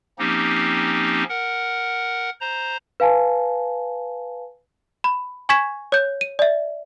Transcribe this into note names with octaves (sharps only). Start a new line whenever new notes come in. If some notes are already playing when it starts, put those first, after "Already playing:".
F3 A#3 C4 C#4 D#4 G4
A#4 F#5
C5 A#5
B4 F5 G#5 A5
B5
G#5 C#6 G#6 B6 E7
C#5 G6
D#7
D5 E5